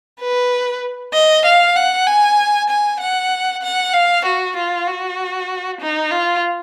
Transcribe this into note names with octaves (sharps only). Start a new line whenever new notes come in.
B4
D#5
F5
F#5
G#5
G#5
F#5
F#5
F5
F#4
F4
F#4
D#4
F4